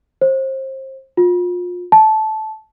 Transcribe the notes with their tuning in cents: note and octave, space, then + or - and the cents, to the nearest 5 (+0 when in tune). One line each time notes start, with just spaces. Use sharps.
C5 +30
F4 +30
A5 -15